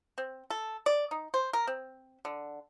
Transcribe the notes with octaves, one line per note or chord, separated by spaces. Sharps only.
C4
A4
D5
D#4
C5
A#4
C4
D3